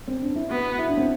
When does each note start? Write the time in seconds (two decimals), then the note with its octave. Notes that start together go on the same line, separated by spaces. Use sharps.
0.08 C4
0.22 D4
0.36 E4
0.50 B3 F#4
0.78 E4
0.88 D4
0.97 C4